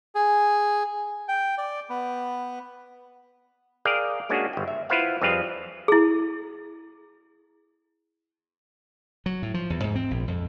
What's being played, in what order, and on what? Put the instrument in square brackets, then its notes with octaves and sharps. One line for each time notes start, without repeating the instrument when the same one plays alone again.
[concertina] G#4
G5
D5
B3
[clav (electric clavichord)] G#4 A#4 D5 F5 G5
G#3 A#3 C#4 D4 F#4 G#4
G1 G5
E5
E4 F4 B4 C5 F5 F#5
F2 G3 C4 G#4 B4 F5
[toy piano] E4 G#4
[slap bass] F#3
A2
F3
E2
G#2
C4
A#1
F2